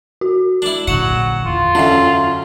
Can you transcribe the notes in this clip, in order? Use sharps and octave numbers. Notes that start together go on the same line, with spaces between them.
F#4
D4 E4
A#1 D3 F#3 F#5 C#7 E7
E2 F4
F#2 D3 C#4 E5